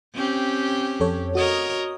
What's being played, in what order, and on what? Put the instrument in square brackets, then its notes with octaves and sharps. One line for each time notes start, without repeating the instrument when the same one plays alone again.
[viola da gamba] C4 C#4 G4
[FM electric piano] F2 A4 C#5
[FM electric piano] F#4 D#6 [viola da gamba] A#4 C#5 D#5